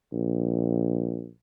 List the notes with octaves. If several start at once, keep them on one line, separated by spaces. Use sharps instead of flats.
A#1